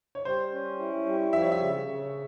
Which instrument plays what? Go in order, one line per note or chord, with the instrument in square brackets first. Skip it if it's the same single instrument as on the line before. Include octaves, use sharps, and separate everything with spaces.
[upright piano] C#5
[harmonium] G3 [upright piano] C5
[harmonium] C#4
E4
G3
[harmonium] F3 [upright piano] E5
[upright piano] C#5
E5
[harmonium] C#3
C#3